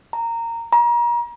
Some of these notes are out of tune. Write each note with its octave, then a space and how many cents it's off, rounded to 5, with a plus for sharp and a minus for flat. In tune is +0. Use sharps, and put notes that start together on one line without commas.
A#5 -15
A#5 +35